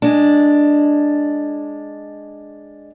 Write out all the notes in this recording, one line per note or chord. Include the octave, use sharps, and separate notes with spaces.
G#3 D4